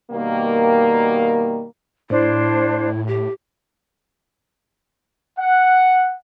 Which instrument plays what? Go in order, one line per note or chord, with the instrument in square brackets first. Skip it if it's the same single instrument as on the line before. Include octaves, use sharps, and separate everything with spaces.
[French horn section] B2 D#3 G3 A#3
[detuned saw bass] A2 [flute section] D4 C5 [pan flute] E4
[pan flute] G4
[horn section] F#5